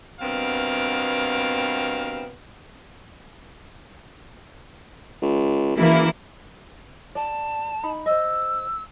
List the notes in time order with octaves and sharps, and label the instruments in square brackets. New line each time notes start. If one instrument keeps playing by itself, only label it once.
[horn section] G2 B2 B3 C4 A#4 F5
[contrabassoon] C#2
[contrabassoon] F#1 [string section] E3 A#3 E4
[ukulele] D5 [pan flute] A5
[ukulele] D#4 B5
[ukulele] C5 D#5 [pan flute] E6